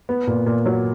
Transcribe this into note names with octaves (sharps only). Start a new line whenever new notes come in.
B3
A#2
A#2
F#3